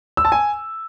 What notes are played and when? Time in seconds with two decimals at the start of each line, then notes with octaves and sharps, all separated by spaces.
0.17 E6
0.25 A5
0.32 G#5